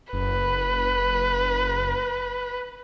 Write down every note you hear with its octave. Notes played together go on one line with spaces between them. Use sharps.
F#1 B4